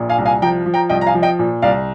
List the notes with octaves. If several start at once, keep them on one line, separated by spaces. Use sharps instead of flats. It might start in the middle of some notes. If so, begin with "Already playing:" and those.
Already playing: A#1 A#2
F5 G#5
C2
F5 G#5
F3 G5 A#5
F3
G5 A#5
C2 D#5 G5
A#5
F5 G#5
F3
D#5 G5
A#2
C2 D5 F5